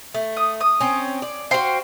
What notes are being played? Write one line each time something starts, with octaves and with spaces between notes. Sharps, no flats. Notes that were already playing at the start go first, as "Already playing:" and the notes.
A3
D#6
D#6
C4 C#4
D5
F#4 C5 F5 G5 C6